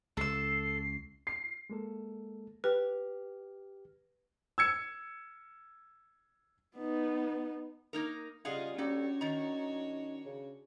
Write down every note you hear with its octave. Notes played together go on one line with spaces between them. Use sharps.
C#2 A4 E6 C7
C7
G#3 A#3 A4
G4 B4 F6
E6 G#6 C#7
B3 D#4
A#3 D#4 A#4
C#3 G3 F4 G#4 D#5 F5 F#5
G3 A#3 C#4 D4 F#4 A4 C#5
D#3 D#4 A#5
C#3